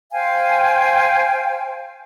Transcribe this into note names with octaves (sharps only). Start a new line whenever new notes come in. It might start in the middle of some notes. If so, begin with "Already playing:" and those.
C5 F5 G5 G#5